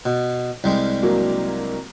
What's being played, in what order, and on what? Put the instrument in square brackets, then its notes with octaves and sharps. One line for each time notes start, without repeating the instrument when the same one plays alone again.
[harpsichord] B2
C2 G3 G#3
[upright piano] F#3 A#3 D4